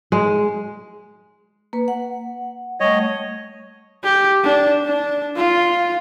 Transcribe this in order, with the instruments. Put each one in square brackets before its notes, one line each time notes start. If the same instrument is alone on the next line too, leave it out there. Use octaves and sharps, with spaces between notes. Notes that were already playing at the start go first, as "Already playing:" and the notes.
[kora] G#3
[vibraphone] A#3 B4
F#5
[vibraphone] G3 A3 [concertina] C#5 D#5
[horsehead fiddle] G4
D4
D4
F4